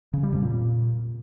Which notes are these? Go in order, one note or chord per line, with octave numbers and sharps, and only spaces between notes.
C#3
G3
F2
A#2